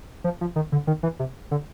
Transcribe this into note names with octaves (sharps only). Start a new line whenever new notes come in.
F3
F3
D#3
D3
D#3
E3
C3
D3